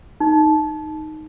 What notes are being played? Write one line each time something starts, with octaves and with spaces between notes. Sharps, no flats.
D#4